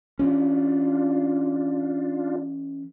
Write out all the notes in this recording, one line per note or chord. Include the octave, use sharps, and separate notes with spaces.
E3 C#4 D4 F4